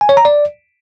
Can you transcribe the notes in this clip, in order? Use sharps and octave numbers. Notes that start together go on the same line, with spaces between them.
G#5
C#5
A#5
D5